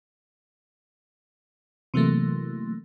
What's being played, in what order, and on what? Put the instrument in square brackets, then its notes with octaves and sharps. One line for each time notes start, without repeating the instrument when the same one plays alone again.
[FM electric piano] C3 E3 F#3 A3 A#3